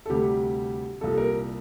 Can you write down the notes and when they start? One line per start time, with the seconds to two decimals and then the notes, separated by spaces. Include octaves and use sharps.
0.06 A4
0.10 D2 C3 G3 G4
1.01 C2 A#2 G3 A4
1.18 A#4